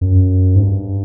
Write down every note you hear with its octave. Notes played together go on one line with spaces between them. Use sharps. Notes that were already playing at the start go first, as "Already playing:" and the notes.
F#2
G#2
G2